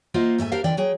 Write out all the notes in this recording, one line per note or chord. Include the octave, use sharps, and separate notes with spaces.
A#3 F4 C5 D#5 E5 F#5
G#2 A3 E5 G#5
D4 G4 A#4 C5 F5
D3 E3 F3 D4 D5 G5
F#3 G#4 G5